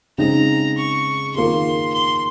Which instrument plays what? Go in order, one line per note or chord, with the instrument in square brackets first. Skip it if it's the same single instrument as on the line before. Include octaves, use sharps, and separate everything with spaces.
[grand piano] C#3 G#3 C4 D#4 G#4 [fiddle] A#5
[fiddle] C#6
[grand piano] D#3 A#3 F4 G#4 [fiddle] C6
[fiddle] C6